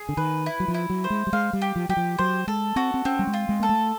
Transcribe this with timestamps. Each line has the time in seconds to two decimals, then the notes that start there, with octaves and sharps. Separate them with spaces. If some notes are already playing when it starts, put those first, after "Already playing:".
Already playing: G#4
0.09 D3
0.17 D#3 B4
0.46 E4
0.60 F#3
0.68 F3
0.74 E4
0.90 F#3
1.04 C5
1.10 G#3
1.27 G3
1.33 G#3 F5
1.53 G3
1.62 G4
1.76 F3
1.89 F#3 G4
1.97 F3
2.19 F#3 C5
2.47 G#3 A4
2.76 C4 F#4
2.94 C4
3.05 C4 C#4
3.19 G3
3.27 G#3
3.34 F4
3.49 G#3
3.60 A#3 A4
3.69 A3